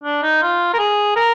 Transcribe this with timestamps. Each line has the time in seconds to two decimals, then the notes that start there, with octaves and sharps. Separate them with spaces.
0.04 D4
0.23 D#4
0.42 F4
0.74 A#4
0.79 G#4
1.16 A#4